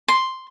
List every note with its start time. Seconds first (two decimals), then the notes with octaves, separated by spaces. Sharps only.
0.08 C6